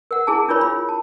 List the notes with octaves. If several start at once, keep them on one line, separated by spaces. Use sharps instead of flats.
A#4 F#5
E4 G#4 G#5 A5
D4 E4 F4 A#4 C#5 B5
F4 B5
A5